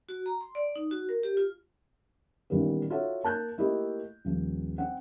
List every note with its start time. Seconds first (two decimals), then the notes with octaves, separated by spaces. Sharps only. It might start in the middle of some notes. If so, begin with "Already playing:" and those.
0.09 F#4
0.26 A#5
0.41 C6
0.55 D5
0.76 D#4
0.91 F#4
1.09 A#4
1.23 G4
1.37 F4
2.50 A1 A#2 D#3 G3 B3
2.90 F4 F#4 A4 C#5 E5 F#5
3.23 A#3 A5 F#6 G6
3.58 A3 A#3 E4 F4 G4 D#5
4.25 D#1 F3
4.78 C4 F#5